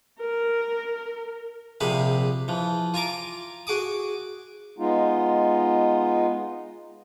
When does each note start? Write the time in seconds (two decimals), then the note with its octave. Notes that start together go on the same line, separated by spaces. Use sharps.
0.20 A#4
1.80 A#1 C3 G#4 F5 B5
2.48 E3 F3
2.94 F4 G#5 A#5 D6
3.67 F#4 G#4 D6 D#6
4.79 G#3 B3 D#4 F4